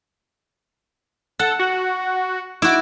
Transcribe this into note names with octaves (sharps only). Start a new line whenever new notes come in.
A4 F#5
F#4
E4 F#4 D6